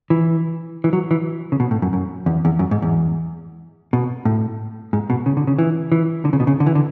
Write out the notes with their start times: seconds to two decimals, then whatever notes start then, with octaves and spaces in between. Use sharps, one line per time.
0.10 E3
0.84 E3
0.93 F#3
1.11 E3
1.52 C#3
1.60 B2
1.71 A2
1.82 F#2
1.93 F#2
2.26 E2
2.45 E2
2.59 F#2
2.71 G#2
2.82 E2
3.93 B2
4.25 A2
4.93 G#2
5.10 B2
5.26 C#3
5.37 D3
5.47 C#3
5.59 E3
5.92 E3
6.25 D3
6.33 C#3
6.40 B2
6.47 C#3
6.60 D3
6.66 E3
6.75 D3